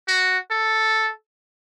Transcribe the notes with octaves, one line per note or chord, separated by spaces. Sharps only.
F#4
A4